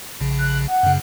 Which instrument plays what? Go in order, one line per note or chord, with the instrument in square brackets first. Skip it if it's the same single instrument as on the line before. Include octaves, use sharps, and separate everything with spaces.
[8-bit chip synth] A#1 C#3
[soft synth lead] F#6
F#5
[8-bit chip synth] F#2 C#3